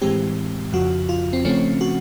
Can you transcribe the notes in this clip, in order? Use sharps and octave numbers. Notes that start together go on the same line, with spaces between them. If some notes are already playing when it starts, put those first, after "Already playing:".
A2 E3 G#3 C4 G4
F2 C#3 F3 F#4
F4
C4
C#3 F3 A3 C4 C#4
F#4